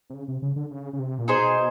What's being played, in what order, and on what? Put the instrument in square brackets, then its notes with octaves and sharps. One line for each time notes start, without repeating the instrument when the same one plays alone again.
[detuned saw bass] C3
C#3
C3
C#3
D3
C#3
C#3
C3
A#2
[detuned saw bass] B2 [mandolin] D#4 G#4 C5 D#5